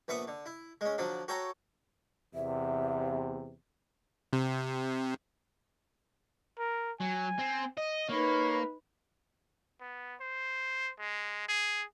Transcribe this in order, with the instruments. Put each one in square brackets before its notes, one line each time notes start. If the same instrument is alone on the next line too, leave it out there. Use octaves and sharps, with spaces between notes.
[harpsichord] A#1 B3 E5 C#6 D#6
D3
E4
G#3 C#4
D3 F3 F#3 D4
F#4 A4 C#5 G5 A#5
[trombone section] E2 C3 [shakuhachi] E5
[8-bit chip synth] C3
[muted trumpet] A#4
[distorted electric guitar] F#3 [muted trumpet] G#5
[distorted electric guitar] C4
D#5
[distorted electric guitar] A#3 [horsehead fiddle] D#4 B4 [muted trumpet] C#5
[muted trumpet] B3
C5
G#3
G#4